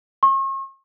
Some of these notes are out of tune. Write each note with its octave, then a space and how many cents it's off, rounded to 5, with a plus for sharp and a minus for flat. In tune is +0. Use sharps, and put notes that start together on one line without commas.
C#6 -40